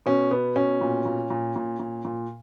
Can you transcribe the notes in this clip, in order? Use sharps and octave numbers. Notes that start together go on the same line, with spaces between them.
B2 C#4
B2 B3
B2 C#4
A#2
A#2
A#2
A#2
A#2
A#2